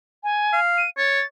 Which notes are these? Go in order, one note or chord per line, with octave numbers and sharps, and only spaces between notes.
G#5
F5
D#7
C#5 A6